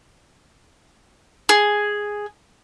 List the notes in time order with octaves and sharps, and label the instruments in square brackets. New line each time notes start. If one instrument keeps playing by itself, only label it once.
[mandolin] G#4